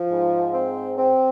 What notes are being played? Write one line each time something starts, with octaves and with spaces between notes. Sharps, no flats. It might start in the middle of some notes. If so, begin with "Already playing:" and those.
Already playing: F3
G#2
C4
C4